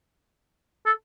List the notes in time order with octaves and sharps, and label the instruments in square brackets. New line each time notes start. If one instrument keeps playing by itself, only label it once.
[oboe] A4